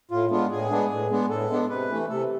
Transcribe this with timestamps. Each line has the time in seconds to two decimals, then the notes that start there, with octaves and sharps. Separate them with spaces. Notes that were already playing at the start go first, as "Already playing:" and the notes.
0.11 A2 F4
0.31 G#3 B3 D4 F4
0.51 A2 G#4
0.70 G#3 B3 D4
0.91 A2
1.10 G#3 B3 D4
1.30 A2 A4
1.50 G#3 B3 D4
1.69 C3 B4
1.89 E3 A3
2.09 C3 A4